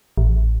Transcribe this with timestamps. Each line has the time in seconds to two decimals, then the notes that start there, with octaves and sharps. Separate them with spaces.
0.18 A1